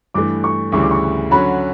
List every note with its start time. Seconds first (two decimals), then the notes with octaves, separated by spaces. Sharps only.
0.14 G2 E3 A3 D6
0.44 C#6
0.72 D2 C#3 E3 G3 C#6
0.82 D6
0.91 C#6
1.31 D3 F#3 C#4 F#4 B5